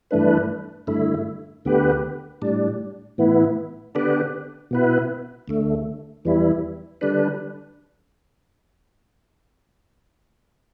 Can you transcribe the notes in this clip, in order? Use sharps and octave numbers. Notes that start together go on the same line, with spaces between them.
G2 E3 A3 D4 B4
G2 D3 A3 E4
D2 D3 B3 G4 B4
A2 G3 D4
A2 E3 B3 E4
D3 B3 D4 G4 B4
B2 B3 E4 B4
D2 D3 A3
E2 E3 G3 E4
D3 G3 D4 B4